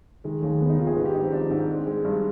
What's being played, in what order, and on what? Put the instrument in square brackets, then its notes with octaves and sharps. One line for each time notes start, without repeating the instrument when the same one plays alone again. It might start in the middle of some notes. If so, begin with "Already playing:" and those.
[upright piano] D#3 G#3
D#2 G#3
D#2 B3
D#4
D#3 F4
G#4
G#2 B4
G4
G#2 D#4
C4
F3 D4
G#2 C4
G#3
G#3
G2